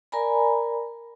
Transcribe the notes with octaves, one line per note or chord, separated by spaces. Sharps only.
A#4 D5 G#5 A#5 B5